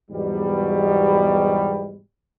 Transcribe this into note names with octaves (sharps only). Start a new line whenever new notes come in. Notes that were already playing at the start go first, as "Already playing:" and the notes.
E2 G#2 B2 F#3 G3